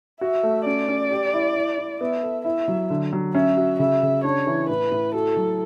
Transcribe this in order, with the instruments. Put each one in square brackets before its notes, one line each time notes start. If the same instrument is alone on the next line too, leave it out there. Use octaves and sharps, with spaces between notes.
[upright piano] F#4 [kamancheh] E5
[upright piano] A3
[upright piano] C#4 [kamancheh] D5
[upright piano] C#4
G4
E4
E4
E4
[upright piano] B3 [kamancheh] E5
[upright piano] A4
[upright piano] E4 [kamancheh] E5
[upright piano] F#3
D3
F#3
[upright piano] C#4 [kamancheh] E5
[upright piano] F#4
[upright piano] C#3 [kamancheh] E5
[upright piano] C#3
[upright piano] D4 [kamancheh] C#5
[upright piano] E3
[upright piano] A2 [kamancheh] B4
[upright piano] A2
[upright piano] F#4 [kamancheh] A4
[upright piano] F#3